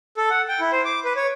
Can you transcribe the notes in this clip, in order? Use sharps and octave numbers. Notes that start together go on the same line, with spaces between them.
A4
F#5
G5
E4
C5
D6
B4
C#5